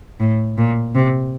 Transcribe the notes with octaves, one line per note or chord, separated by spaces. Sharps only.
A2
A#2
C3